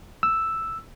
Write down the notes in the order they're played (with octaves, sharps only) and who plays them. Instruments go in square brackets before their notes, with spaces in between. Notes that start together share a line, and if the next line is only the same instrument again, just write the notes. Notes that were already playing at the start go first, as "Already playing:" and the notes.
[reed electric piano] E6